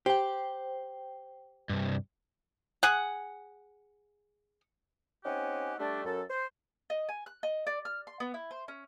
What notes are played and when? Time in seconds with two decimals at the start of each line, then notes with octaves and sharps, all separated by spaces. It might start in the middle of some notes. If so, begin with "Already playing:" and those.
0.06 G4 C5 G5
1.69 C2 G2
2.83 G#4 F#5
5.24 C4 C#4 D#4 G4 F#5 G#5
5.79 G3 A3 D4
6.05 F#2 A4
6.29 C5
6.90 D#5
7.09 G#5
7.26 F#6
7.43 D#5
7.67 D5
7.85 F6
8.07 C6
8.20 B3
8.34 E4
8.51 C5
8.68 C#4